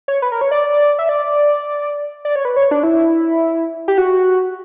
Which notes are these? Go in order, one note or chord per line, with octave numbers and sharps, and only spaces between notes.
C#5
B4
A#4
C#5
D5
E5
D5
D5
C#5
B4
C#5
D4
E4
G4
F#4